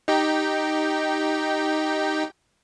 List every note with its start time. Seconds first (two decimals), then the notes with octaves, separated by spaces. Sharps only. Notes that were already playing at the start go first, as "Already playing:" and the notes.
0.08 D#4 G4 G5